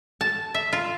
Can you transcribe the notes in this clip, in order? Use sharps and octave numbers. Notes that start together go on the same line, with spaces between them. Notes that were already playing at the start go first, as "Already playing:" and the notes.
A5
E5
F4